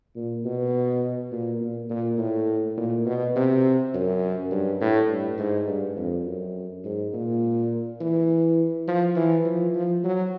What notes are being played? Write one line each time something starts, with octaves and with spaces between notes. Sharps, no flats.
A#2
B2
A#2
A#2
A#2
A2
A#2
B2
C3
F#2
G2
A2
G2
G#2
G2
F2
F#2
G#2
A#2
E3
F3
E3
F3
F3
F#3